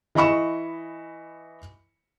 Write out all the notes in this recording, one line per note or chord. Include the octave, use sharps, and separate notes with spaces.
E3 D#5 B5 C#6 E7